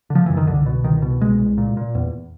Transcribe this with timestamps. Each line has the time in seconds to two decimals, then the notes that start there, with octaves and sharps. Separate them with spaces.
0.10 D3
0.15 F3
0.26 F#2 E3
0.37 D#3
0.47 C2 D3
0.66 B2
0.84 C2 D#3
1.02 B2
1.21 C2 G#3
1.39 C2
1.58 A#2
1.77 A#2
1.95 E2